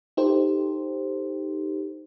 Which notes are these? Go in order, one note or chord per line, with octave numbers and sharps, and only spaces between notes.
D#4 G4 A4 C5